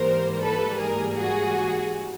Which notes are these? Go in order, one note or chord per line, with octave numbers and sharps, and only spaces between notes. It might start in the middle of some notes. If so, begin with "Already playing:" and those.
Already playing: G#2 E3 G3 A#3 A#4 C5
A4 B4
G#4 A#4
F#4 G#4